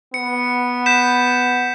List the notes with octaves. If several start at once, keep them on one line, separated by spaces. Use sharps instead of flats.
B3 C#7
G6 B6 E7